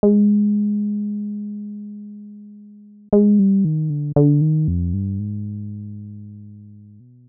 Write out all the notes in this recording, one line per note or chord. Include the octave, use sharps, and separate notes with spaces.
G#3
G#3
G3
D#3
D3
D3
D#3
F2
G2
G#2
B2